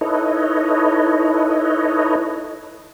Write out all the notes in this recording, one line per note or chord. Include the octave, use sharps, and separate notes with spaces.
D#4 E4 A4 B4 C#5 D#5